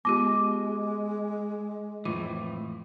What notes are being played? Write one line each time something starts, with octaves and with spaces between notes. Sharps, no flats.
G#3 B3 F4 G4 D6
F2 A2 E3 F4